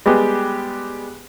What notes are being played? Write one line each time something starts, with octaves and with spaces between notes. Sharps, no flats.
G3 G#3 B3 G4 G#4